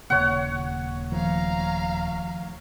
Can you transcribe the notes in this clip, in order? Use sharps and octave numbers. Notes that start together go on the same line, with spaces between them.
D#1 C#3 A#3 C#5 F#5
D#3 F3 A3 F5 A#5